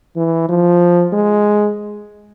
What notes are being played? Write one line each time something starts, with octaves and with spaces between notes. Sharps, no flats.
E3
F3
G#3